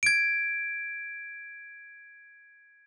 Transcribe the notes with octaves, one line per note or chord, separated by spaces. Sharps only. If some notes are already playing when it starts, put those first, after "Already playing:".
G#6 D7